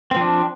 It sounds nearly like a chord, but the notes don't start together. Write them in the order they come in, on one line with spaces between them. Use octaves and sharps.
C4 F3 D4